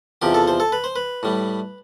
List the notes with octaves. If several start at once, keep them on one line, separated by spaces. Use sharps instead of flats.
E2 C3 F3 G4
A4
C5
A4
B4
C5
B4
A2 G3